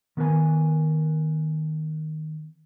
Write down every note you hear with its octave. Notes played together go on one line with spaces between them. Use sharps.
D#3 B3 A#4 B4 G#5